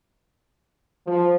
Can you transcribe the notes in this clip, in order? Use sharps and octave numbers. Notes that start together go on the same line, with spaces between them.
F3